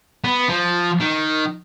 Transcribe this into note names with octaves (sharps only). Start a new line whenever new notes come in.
B3
F3
D#3